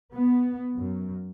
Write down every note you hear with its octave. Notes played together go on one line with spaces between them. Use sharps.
B3
F#2